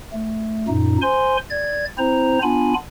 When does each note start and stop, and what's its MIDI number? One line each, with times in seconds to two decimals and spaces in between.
0.12 0.67 57
0.68 0.98 42
0.68 0.98 46
0.68 0.98 63
1.02 1.37 72
1.02 1.37 80
1.02 1.37 84
1.50 1.85 74
1.50 1.85 92
1.98 2.39 60
1.98 2.39 64
1.98 2.39 72
1.98 2.39 82
2.43 2.74 59
2.43 2.74 62
2.43 2.74 65
2.43 2.74 80
2.43 2.74 83